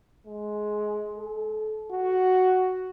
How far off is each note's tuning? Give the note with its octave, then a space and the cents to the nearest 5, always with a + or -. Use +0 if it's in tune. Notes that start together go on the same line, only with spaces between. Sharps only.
G#3 +15
A4 -30
F#4 +5